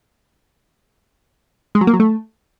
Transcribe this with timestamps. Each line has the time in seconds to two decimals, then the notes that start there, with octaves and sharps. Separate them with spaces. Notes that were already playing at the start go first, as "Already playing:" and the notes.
1.75 G#3
1.81 F#3
1.87 A#3
1.93 F#3
2.00 A3